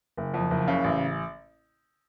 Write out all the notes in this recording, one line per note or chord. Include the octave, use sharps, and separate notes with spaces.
F#1
F2
F#1
C#3
A1